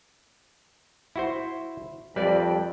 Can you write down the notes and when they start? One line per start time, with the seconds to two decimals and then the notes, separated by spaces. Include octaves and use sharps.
1.16 E4 F#4 C5
2.16 F2 G3 B4 D5